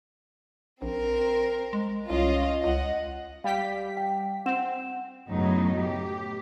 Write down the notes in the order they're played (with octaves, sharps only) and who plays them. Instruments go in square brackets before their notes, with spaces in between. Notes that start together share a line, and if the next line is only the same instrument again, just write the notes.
[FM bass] A#1 [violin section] C4 A#4
[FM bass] G#3
[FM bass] C2 [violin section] C#4 F4 D#5
[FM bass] C#2 [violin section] D#5 F#5
[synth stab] G3 G4 B6 [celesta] F5
[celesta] G5
[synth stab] C4 [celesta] F#5 E7
[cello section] F#2 A2 C#3 F#3 B3 D#4
G4